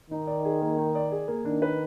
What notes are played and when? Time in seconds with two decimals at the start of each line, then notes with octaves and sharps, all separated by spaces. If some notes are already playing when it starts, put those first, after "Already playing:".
0.10 D#3 D#4
0.27 D5
0.45 G#4
0.61 A#3
0.78 D#4
0.95 D5
1.11 G#4
1.28 A#3
1.45 D#3 D4
1.62 B4